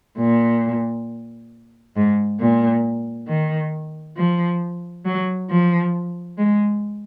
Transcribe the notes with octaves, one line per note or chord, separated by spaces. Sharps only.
A#2
G#2
A#2
D#3
F3
F#3
F3
G#3